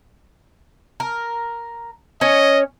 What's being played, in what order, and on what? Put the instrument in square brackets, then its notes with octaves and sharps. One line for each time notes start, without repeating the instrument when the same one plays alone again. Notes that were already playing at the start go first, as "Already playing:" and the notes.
[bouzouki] A#4
[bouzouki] C#4 C#5 [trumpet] D#5